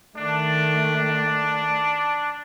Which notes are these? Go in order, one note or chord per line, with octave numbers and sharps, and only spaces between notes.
D#3 A3 D4